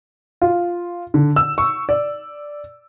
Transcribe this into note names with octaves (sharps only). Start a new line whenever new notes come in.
F4
D3
E6
C#6
D5